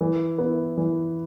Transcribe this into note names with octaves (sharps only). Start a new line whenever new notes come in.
E3
B3 E4
E3